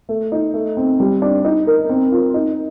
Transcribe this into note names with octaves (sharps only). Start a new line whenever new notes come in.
A3
D#4
A3
C4
G3
D4
D#4
A#4
C4
F4
D#4